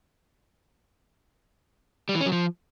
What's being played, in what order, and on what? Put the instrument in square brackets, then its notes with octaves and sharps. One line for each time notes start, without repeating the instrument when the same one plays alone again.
[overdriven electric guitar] G3
E3
C#4
F#3
F3